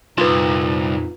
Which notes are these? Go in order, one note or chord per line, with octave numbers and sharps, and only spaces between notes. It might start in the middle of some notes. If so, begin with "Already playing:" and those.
C2 F2 A#2 D#4 F4 B4